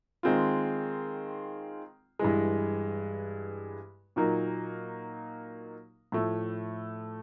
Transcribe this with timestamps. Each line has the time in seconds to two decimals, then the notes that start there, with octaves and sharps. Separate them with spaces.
0.23 D#3 G#3 C4 F4
2.19 G2 E3 G#3
4.16 A#2 F#3 A#3 D#4
6.12 A2 F3 A3